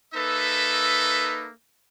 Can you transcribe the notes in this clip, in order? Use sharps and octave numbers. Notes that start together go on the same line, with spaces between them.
A#3 D#4 A4 B4 E5